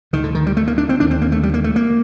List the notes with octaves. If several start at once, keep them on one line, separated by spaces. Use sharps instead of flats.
D2 D3 D#3
D3
D#3
G3
A3
A#3
D4
C4
D#2 D3 D4
C4
A#3
A3
G3
A#3
A3
A#3